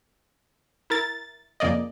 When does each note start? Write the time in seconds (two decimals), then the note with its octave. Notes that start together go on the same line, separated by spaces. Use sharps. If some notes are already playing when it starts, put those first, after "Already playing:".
0.90 E4 A#4 A6
1.60 F2 C#3 A#3 D5 D#5